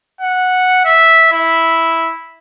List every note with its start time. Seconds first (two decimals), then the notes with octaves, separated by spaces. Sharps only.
0.21 F#5
0.85 E5
1.32 E4